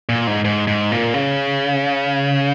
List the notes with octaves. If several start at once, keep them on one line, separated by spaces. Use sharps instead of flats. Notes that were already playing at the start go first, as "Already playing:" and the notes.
A#2
G#2
G#2
G#2
A#2
C#3